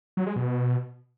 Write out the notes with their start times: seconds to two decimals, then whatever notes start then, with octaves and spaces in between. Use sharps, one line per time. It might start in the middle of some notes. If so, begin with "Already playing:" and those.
0.17 F#3
0.26 G#3
0.36 B2